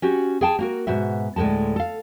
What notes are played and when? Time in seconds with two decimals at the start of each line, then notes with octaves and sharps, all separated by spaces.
0.02 C#4 F#4 G4
0.41 G#4 F5 G5 A5
0.59 A#3 F#4 A#4
0.87 G#2 B2 F#4 E5
1.36 D2 A2 C#3 G#3 A5
1.76 A4 F5